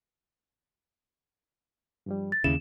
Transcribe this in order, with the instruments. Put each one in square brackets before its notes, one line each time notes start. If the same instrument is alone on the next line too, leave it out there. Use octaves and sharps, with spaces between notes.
[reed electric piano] G2 F3 G3
[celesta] A6
[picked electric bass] D#2 C#3 [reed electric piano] E4 [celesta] E7